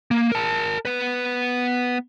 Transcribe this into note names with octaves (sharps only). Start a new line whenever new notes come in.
A#3
A#4 A5
B3 B4